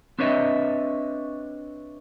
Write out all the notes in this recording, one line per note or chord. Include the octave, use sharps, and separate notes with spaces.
C4 D4 B4 C#5 D#5 E5